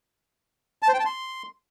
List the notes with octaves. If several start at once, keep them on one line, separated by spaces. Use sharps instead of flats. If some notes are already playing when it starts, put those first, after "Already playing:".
A5
C5
G5
A5
C6